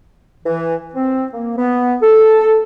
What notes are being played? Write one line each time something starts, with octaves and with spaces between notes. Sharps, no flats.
E3
C4
A#3
B3
A4